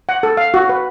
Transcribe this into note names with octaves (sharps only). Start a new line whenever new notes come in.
F#5
A4
F5
F#4
B4